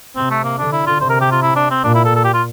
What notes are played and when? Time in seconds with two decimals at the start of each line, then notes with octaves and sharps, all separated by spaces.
0.16 C3 C4
0.30 A3
0.44 A#3
0.58 D3 D4
0.73 E4
0.87 F4
1.00 C3 C5
1.10 A#4
1.21 G4
1.32 F4
1.42 E4
1.56 D4
1.71 C4
1.84 A#2 D4
1.95 E4
2.05 A4
2.16 A4
2.25 G4
2.33 F4